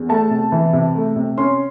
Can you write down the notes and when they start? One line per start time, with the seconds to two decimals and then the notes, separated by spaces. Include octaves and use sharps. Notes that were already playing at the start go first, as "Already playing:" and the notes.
Already playing: E2
0.09 A3 A5
0.30 C3
0.52 E3
0.73 C3
0.95 A3
1.16 C3
1.38 C#4 C6